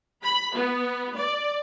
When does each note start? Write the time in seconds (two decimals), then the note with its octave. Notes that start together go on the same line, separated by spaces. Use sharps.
0.22 B5
0.54 B3
1.15 D5